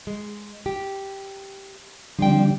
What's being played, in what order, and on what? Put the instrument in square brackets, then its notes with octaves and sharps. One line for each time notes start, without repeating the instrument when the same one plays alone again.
[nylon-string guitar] G#3
G4
[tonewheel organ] D3 G3 D4 [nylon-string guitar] F3 C4 G5